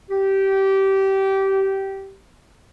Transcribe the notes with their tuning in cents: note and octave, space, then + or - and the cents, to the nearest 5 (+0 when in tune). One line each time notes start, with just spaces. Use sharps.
G4 -20